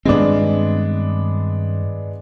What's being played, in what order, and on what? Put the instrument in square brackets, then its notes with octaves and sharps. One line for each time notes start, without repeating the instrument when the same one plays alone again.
[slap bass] G2 D#3 C4 [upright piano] G#3 B3 D4